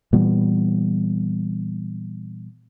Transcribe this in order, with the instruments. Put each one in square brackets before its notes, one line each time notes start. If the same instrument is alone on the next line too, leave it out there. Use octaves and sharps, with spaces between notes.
[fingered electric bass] A#2 E3 G3 B3